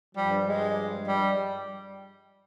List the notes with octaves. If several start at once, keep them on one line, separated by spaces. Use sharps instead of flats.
G2 F3 G3
G#3
G3